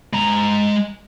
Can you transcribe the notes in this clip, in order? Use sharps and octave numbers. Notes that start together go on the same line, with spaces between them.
G#3 A#5